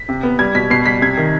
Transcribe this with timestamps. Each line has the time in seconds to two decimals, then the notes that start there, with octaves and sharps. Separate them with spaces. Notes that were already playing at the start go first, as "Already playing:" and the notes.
Already playing: B6
0.09 C3
0.23 B3
0.39 G3 G#6
0.55 B2 B6
0.70 B2 C7
0.86 G3 B6
1.02 C3 G#6
1.17 D#3